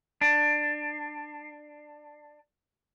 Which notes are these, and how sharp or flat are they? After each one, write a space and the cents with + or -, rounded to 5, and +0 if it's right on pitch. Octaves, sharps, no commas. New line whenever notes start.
D4 +15